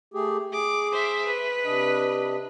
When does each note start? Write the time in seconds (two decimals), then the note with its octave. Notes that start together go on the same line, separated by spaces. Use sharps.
0.14 A3 G4 G#4
0.52 G#4 D6
0.92 C5 E5
1.26 B4
1.65 C3 D4 D#5